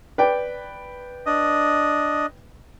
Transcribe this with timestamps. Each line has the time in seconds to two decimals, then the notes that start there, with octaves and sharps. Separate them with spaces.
0.18 B4 D5 G5
1.26 D4 D#5